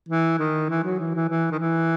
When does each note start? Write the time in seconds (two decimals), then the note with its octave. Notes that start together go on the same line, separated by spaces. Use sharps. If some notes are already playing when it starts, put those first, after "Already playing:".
0.09 E3
0.39 D#3
0.69 E3
0.84 F#3
0.99 E3
1.15 E3
1.29 E3
1.51 D#3
1.59 E3